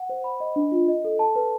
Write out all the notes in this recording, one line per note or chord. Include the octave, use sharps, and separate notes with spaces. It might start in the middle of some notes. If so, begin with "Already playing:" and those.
Already playing: F#5
C5
B5
D#5
D4
F4
D#5
A4
A5
B4